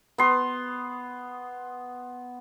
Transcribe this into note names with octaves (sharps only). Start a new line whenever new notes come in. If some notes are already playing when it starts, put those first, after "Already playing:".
B3 C6